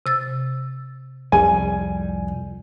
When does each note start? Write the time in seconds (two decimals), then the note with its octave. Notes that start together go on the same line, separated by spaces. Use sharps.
0.06 C3 E6 A6
1.32 C2 F2 G3 G#5